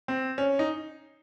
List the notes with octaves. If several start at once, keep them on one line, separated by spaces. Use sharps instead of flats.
C4
C#4
D#4